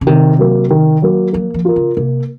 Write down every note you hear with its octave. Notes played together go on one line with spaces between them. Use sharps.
C#3
C3 D#3
F#3 A#3
D#3
F#3 A#3
F#3 A#3
F3
F4 A#4
C#3
C3 A#3